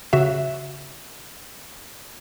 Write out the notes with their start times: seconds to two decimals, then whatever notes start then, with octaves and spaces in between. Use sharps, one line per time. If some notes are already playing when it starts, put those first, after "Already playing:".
0.13 C#3 F#4 E5